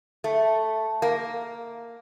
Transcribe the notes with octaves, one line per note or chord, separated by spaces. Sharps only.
A3
A#3